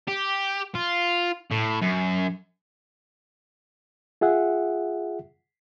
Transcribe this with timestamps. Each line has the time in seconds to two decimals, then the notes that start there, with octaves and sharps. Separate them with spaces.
0.08 G4
0.75 F4
1.51 A2
1.82 F#2
4.21 F4 G#4 E5 F#5